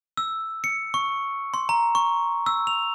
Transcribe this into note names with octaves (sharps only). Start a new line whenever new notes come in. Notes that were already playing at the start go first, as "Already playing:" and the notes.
E6
C#7
C#6
C6
A#5
C#6
E6
F7